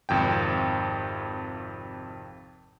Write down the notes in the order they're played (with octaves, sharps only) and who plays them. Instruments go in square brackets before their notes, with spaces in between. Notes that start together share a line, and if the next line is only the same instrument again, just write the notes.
[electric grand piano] G#1 F2 C3 G5